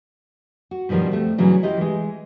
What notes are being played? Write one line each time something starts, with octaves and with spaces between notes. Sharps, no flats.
F#4
G2 B2 D#3 F3 G3
A3 C4
G2 C#3 E3 F#3
E4 F4 G4 D#5
E3 G#3